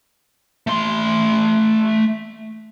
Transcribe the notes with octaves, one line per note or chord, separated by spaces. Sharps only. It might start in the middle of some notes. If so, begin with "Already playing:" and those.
A3 C6